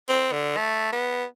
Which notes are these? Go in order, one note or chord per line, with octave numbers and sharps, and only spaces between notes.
C4
D3
A3
B3